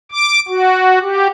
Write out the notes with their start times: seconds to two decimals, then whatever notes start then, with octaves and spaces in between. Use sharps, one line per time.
0.11 D6
0.48 F#4
1.02 G4